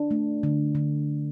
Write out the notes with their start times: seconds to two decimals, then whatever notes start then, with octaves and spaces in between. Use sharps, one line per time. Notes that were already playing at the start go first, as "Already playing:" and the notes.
Already playing: D4
0.11 A3
0.43 D3
0.75 D3